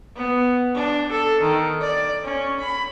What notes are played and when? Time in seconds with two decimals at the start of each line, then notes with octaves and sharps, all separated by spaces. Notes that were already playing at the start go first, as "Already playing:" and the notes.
0.16 B3
0.75 D4
1.12 A4
1.41 D#3
1.81 D5
2.24 C#4
2.60 B5